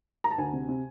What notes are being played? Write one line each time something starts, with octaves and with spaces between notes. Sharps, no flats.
A#5
A5
D2 G#5
C3
C3